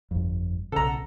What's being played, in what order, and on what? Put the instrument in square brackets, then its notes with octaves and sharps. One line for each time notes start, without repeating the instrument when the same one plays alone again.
[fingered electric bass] G1 F2
[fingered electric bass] B1 C#3 [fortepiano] A4 A#5